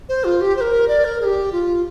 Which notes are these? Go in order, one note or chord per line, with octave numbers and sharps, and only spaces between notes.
C5
F4
G4
C5
A#4
D5
A#4
G#4
G4
F4